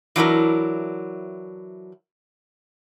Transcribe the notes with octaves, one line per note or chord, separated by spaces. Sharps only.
E3 F#3 D4 E4 A#4